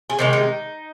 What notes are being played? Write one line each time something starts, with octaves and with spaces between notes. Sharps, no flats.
G#4
C3 D#3 G#3 G4
D#4